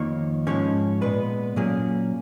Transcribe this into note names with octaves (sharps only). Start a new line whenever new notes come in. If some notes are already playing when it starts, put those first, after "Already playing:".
Already playing: F2 D#3 A#3 C#5
G#2 F3 G#3 C#4 C#5
A#2 G#3 B3 B4
A#2 F#3 A#3 C#4 G#4